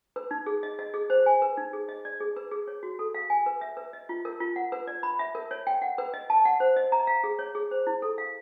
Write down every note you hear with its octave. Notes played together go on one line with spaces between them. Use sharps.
B4
D#4
G#4
D#5
D#5
G#4
C5
G#5
B4
D#4
G#4
D#5
D5
G#4
B4
G#4
C#5
F#4
A4
F5
G#5
B4
E5
B4
D#5
F4
A#4
F4
F#5
B4
D5
B5
E5
A#4
C#5
G5
F#5
B4
D#5
A5
F#5
C5
D#5
A#5
F5
G#4
C#5
G#4
C5
E4
A4
F5